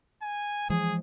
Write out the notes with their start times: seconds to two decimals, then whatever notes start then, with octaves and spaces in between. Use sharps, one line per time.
0.22 G#5
0.70 E3 F3 G#3 G#4